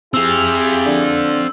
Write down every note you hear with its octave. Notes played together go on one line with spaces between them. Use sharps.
C4 E4 G4 G#4 F5 E6
D3